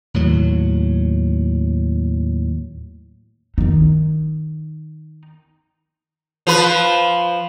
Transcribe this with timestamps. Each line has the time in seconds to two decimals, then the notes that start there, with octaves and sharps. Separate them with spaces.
0.14 D#2 A2 F#3
3.58 D#3 D#4
6.47 F3 B4